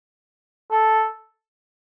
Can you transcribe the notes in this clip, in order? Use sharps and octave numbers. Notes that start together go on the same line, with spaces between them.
A4